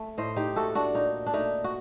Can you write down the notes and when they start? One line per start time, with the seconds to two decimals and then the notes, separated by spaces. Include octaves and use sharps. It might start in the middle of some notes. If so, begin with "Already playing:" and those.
Already playing: A3
0.18 A2 C5 D#5
0.36 D#4 G4
0.56 A3 F#4 A4
0.75 D4 F#4
0.94 A#2 D#4
1.26 D4
1.33 A3 D#4
1.64 F#4